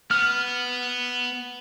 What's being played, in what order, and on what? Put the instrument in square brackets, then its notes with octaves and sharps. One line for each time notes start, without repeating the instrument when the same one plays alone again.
[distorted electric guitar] B3 [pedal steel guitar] F6